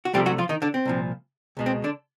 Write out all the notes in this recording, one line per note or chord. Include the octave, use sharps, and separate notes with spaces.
F#4
C2 C3 F3 G3 A3 G4
F#3 F#4
F3 F4
D#3 D#4
D3 D4
C4
C2 A#2 F3
C#2 B2 G#3
C4
D3 D4